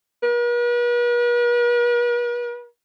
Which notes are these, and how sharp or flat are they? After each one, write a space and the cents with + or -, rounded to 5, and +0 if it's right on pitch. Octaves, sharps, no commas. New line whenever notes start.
B4 -45